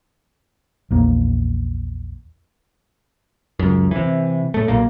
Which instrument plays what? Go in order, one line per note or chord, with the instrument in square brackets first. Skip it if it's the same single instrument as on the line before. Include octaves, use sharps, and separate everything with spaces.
[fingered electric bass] A#1 E2 A#3
[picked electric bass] C#2 F#2
C3 E3
A2 A3
B1 A#2 A#3